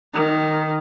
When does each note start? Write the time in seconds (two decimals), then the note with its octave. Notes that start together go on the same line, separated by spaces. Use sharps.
0.14 D#3